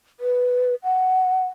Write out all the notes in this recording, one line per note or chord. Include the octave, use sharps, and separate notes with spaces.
B4
F#5